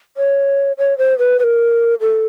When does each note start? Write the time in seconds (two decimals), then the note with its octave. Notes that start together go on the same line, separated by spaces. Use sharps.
0.17 C#5
0.78 C#5
0.98 C5
1.19 B4
1.39 B4
1.43 A#4
2.01 A4